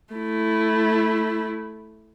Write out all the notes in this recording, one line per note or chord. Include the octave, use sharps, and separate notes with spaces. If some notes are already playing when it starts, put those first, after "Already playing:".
A3 E4